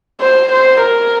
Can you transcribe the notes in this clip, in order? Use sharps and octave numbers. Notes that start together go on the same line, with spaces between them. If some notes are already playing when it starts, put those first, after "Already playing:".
C5
C5
A#4